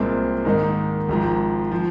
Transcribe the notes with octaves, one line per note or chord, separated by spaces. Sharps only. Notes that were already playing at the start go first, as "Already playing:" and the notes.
Already playing: C2 A#2 G#3 C4
G#2 D#3 A#3 D#4
G#1 G#2 F3
F3